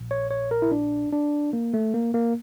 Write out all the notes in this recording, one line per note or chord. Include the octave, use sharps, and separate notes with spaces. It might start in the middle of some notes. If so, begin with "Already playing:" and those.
Already playing: A#1 A#2
C#5
C#5
A#4
E4
D4
D4
A#3
A3
A#3
A#3